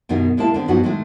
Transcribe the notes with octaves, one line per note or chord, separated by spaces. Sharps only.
F#2 B2 D#3 D#4 G#4
A#2 G#3 A#3 E4 A5
D3 D#3 B3 C4
G2 F3 F#3 B3 D#4 F#4
A2 D#3 G#3 A3